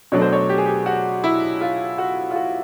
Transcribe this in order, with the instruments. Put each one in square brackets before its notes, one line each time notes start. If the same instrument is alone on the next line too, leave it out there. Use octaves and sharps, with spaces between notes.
[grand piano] B2 F#3 A3 D4 C#5
C5
C#5
G4
G#4
G4
F#4
E4
F4
F#4
F4
F#4